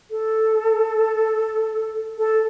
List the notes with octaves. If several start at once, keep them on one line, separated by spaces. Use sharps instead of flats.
A4
A4